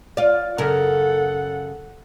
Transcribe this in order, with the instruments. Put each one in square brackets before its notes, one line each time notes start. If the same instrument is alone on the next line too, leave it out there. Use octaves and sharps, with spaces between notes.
[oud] F4 D5
[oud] F#2 C#3 A#4 [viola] A4 F#5